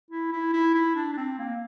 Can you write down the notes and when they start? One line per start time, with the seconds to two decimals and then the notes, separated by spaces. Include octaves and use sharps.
0.11 E4
0.32 E4
0.53 E4
0.75 E4
0.96 D4
1.13 D4
1.17 C4
1.39 A#3